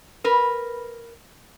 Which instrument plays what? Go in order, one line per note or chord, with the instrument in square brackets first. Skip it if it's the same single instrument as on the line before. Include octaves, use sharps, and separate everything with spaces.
[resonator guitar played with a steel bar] A#4 B4